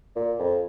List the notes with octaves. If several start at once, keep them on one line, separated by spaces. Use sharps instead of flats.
A#2
F2